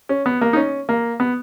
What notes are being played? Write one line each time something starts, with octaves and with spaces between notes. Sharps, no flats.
C#4
B3
A#3
D#4
C#4
A#3
B3